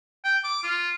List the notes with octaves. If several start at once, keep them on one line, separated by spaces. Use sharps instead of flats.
G5
D6
F4